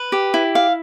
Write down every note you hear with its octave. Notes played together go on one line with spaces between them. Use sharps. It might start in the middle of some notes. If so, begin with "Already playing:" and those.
Already playing: B4
G4
E4
F5